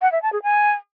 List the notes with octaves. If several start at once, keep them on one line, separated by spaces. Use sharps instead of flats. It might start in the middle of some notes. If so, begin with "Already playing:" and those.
F#5
E5
A5
G#4
G#5